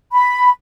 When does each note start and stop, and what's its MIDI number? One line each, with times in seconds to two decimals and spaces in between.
0.12 0.49 83